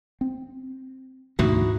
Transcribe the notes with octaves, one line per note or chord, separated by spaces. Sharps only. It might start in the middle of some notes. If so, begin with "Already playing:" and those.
C4
D2 G#2 B2 E3 D#4 E4 F#4